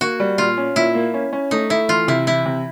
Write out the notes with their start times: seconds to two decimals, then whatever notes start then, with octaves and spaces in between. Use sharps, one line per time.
0.01 A#3 F#4
0.20 G3
0.38 A#2 F4
0.57 C#4
0.76 A#2 E4
0.95 A#3
1.14 C#4
1.33 C#4
1.51 A3 D#4
1.70 A3 E4
1.89 E3 F4
2.08 C3 E4
2.27 E3 E4
2.45 C3